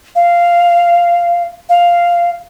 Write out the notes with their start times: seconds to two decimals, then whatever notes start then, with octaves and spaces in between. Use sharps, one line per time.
0.15 F5
1.69 F5